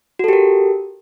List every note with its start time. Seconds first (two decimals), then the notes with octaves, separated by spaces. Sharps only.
0.19 F#4
0.24 A4
0.28 G4
0.33 A#4